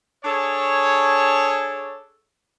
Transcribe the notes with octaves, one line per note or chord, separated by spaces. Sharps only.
D4 G#4 A4 C#5